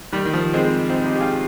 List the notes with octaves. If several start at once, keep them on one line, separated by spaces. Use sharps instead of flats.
D#3 G3
D#3
F3
G#3 C4
C4 D#4
D#4 G4
G4
F4 G#4